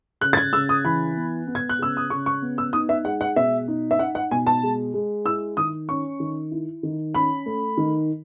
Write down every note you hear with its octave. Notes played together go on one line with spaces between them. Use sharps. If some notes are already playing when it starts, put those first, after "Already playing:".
C#3 F#6
A6
G#6
C#3 E6
D#6
E3 B5
B3
B3
G#6
F#6
C#3 E6
D#6
C#3 C#6
C#6
B3
E6
D#4 D#6
E5
G#3 F#5
F#5
B2 E5
D#4
E5
D#4 F#5
F#5
B2 G#5
A5
G#3
G#3
E4 E6
D#3 D#6
C#4 C#6
D#3
E4
D#3
C#4 B5
A3
D#3